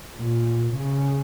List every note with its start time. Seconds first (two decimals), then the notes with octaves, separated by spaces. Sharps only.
0.17 A#2
0.75 C#3